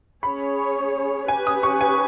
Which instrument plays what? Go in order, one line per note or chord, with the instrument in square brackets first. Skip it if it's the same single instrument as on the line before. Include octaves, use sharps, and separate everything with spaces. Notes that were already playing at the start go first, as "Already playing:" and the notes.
[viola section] C#4 G#4 C#5 [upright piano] B5
[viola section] C#4 G4 B4 [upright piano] G#5
[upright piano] D#6
C#6
G#5